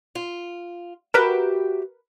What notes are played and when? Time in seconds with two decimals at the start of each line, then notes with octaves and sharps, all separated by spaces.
0.15 F4
1.14 F#4 G4 A#4 B4 E5